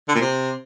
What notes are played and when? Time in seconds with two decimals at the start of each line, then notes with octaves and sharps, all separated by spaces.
0.08 D3
0.15 A#2
0.21 C3